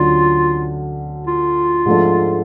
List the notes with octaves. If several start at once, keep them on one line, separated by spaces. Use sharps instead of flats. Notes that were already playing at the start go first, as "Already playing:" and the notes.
Already playing: D2 D3 F#3 C#4 F4
F4
G#2 F3 A3 D4